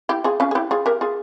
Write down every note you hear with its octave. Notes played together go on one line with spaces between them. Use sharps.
E4 G4
F4 G#4
C#4 F4
G#4
E4 G4
F4 G#4
G4 A#4
F4 G#4